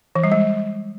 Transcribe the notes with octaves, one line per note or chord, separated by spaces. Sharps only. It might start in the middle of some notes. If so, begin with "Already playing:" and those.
E3
G3
G#3